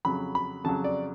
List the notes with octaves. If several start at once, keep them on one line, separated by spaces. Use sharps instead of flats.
F2 C#3 F#3 B5
B5
F2 C#3 F#3 A5
D5